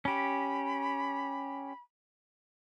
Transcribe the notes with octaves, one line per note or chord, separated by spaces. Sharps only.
C#4 G4 B5